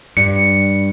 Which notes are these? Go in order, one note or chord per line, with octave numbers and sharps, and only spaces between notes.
G2 C#7